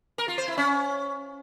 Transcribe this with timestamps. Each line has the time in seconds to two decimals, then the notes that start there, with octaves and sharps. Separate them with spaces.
0.18 A#4
0.28 F4
0.38 C5
0.48 E4
0.58 C#4